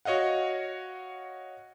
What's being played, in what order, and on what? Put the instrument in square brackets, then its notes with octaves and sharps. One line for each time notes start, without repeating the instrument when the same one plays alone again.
[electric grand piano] F#4 C#5 D#5 F5 F#5